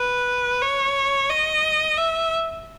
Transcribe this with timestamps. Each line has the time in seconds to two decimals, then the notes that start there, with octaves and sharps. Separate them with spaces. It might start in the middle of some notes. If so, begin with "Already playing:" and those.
Already playing: B4
0.62 C#5
1.29 D#5
1.98 E5